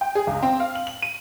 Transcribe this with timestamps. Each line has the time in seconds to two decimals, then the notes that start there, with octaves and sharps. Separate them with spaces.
0.01 G5
0.15 G#4
0.27 C#2
0.43 C4
0.60 F5
0.75 F#7
0.87 F#7
1.02 D#7